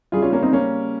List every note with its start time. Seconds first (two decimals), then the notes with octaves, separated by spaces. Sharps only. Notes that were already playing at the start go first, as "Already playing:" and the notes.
0.12 G3 F4 G#4
0.17 C#3
0.22 C#4 F4
0.32 A#3 C#4
0.42 C4 D#4
0.53 A#3 C#4